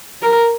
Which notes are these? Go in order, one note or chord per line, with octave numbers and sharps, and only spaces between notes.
A#4